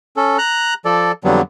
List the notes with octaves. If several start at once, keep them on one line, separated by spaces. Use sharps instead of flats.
C#4 A4
A#5 F#6
F3 A4 D5
F2 D3 F#3 G3 B3